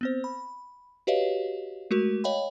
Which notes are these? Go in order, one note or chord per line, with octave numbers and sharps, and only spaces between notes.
B3 C4 C5
B5
F#4 G4 B4 C#5 D#5 F5
G#3 A3 F#4 A#4
C#5 D#5 F5 G5 B5